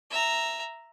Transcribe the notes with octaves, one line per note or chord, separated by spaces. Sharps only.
E5 A#5